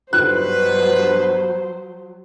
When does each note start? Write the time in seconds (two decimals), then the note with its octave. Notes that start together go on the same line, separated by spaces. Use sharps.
0.13 G2 B2 F#3 B4 C5 F#6